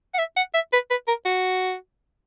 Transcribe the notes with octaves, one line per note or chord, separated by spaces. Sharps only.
F#5
E5
F#5
E5
B4
B4
A#4
F#4